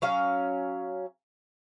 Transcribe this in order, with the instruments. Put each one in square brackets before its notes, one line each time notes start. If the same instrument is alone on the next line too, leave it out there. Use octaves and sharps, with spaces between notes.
[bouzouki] F#3 C#4 F5